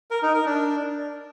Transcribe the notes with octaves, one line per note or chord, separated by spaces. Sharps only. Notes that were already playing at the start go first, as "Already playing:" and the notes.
A#4
D#4
A#4
D4